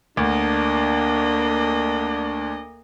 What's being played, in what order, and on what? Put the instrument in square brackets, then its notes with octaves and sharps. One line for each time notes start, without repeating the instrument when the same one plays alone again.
[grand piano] D2 [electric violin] A#3 D#5 [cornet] D4